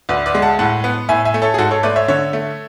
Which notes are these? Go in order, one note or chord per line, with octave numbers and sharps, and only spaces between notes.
D2 B4 D5
B4 D5
G#3
F#5 A5
A2 F#5 A5
B3
A2 E5 G#5
E5 G#5
A3
A4 C#5
G#4
G#2 F#4 A4
A4 C#5
A3 B4 D5
C#5 E5
D3 C#5 E5
A3